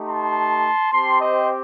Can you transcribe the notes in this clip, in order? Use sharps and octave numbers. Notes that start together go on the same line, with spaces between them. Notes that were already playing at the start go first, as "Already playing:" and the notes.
Already playing: A3 D#4 G4
A5 C6
C4 G4 A5 C6
C5 D#5